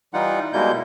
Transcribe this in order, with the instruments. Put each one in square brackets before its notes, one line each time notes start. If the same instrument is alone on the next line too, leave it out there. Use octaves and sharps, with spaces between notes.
[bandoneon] E3 G3 D#4 F4 F#5
B2 G3 G#3 A#3 E4 G6